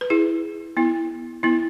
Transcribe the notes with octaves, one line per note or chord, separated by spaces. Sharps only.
B4
E4 G#4
B3 E4
B3 E4